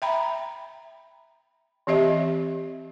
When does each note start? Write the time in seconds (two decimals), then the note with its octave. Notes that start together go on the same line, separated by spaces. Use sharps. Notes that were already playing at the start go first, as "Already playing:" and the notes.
0.02 E5 G5 A#5 B5
1.87 E3 C4 G4 D#5 E5